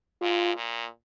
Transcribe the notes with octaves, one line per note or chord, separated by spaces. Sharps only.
G#2 F4
A#2